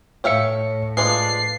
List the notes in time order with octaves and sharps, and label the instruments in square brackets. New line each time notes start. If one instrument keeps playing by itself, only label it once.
[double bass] A2 [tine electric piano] C#5 C#7 [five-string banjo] E5 F5 G5
[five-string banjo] F3 G#3 D4 [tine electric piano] B4 [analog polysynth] C7